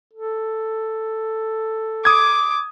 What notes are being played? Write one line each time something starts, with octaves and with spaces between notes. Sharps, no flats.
A4
D6 D#6 G#6